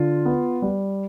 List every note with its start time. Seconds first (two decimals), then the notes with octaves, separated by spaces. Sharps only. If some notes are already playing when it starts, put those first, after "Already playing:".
Already playing: D3 F4
0.25 B3
0.62 G3